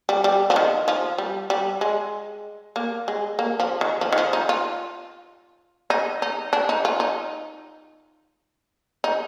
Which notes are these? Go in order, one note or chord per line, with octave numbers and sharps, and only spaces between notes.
G3
G3
F3
D#3
F3
G3
G3
G#3
A#3
G#3
A#3
F3
D#3
F3
D#3
F3
D#4
F4
D#4
D#4
D4
D#4
F4
D#4
D#4